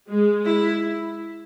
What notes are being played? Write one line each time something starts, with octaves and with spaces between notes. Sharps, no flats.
G#3
E4